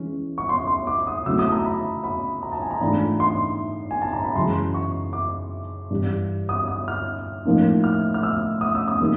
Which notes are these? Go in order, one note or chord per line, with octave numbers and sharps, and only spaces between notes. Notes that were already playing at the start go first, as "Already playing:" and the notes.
Already playing: E3 G#3 C#4
C#6
C6
C6
D6
D#6
C#3 F#3 A3 C4 E4 E6
D#6
A5
A#5
B5
B5
A#5
A5
G#5
A#5
G#2 E3 A3 D4 F4 B5
C6
G#5
A5
A#5
B5
F#2 C#3 E3 G#3 C6
C#6
D6
G2 E3 G3
D#6
D#6
F6
A2 F3 A#3 D#4
F6
F6
E6
D#6
E6
D#6
E3 G3 A#3 D#4